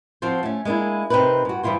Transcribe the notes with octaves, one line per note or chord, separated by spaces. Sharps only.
F3 C4 F4 F#4 C5
A3 C#4
G#3 A#3 C#4 D4 E4
C3 C4 D#4 A#4 B4
G2 F#4
G2 E3 E4 F4 C5